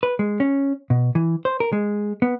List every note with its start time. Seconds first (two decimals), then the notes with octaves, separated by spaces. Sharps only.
0.03 B4
0.19 G#3
0.40 C#4
0.90 B2
1.15 E3
1.45 C5
1.60 A#4
1.73 G#3
2.22 B3